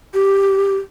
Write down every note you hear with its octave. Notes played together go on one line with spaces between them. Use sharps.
G4